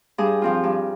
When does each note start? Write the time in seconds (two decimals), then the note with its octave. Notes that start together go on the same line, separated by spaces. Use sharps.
0.18 G2 G#4
0.42 F3 C4 F4
0.63 G2